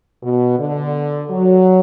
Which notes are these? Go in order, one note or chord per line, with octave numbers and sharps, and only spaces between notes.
B2
D3
F#3